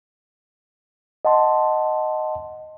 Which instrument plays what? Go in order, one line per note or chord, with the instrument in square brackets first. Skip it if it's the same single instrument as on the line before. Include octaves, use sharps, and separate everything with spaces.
[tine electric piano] D#5 F#5 A5 C6